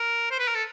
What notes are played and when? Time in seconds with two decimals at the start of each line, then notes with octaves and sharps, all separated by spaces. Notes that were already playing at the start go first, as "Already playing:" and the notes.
Already playing: A#4
0.31 C5
0.39 B4
0.48 A#4
0.55 A4